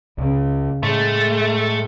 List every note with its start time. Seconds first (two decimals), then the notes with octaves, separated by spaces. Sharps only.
0.18 C#2 C#3
0.83 A2 G#3 A3